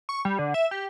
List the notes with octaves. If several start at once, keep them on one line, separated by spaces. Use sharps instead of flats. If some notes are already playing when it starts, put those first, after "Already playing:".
C#6
G3
D3
E5
G4